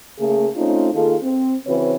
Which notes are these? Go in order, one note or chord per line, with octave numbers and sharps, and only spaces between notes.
C#3 A3 A#3 G#4
A3 C4 C#4 D#4 F4
D#3 A#3 F4 G#4 A4
C4
C#3 E3 C4 F#4 B4 C#5